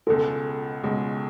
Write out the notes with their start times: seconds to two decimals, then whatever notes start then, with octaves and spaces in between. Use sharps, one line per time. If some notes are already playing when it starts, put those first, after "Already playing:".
0.07 C#2 B2 G#3 A4
0.83 C#2 B2 G#3